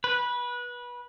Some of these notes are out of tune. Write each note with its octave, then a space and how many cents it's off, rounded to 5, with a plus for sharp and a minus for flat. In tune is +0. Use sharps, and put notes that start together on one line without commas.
B4 -20